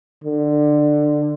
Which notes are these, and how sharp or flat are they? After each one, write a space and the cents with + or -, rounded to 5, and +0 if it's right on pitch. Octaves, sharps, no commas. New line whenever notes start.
D3 +20